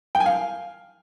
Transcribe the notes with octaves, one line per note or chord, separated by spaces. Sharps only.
G5
G#5
F5